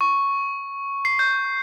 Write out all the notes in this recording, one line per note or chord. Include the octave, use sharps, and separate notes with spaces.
C#6
C7
G6